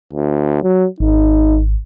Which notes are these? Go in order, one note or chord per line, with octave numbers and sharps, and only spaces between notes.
D2
F#3
G#1 D#4